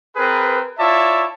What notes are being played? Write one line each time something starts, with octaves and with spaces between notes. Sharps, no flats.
C4 G#4 A#4 B4
E4 F4 C#5 D5 E5 A5